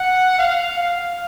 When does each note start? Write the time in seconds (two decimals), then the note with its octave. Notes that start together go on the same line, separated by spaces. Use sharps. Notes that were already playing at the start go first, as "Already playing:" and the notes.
Already playing: F#5
0.38 F5
0.78 F5